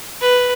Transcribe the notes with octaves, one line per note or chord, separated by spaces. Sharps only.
B4